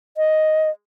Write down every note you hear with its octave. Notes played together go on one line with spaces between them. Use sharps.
D#5